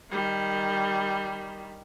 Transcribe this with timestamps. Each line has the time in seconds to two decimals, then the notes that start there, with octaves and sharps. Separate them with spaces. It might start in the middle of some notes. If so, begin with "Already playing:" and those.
0.11 D#3 G3